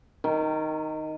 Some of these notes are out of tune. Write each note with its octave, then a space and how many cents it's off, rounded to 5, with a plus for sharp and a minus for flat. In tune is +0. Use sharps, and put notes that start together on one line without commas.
D#3 +0 A#4 -30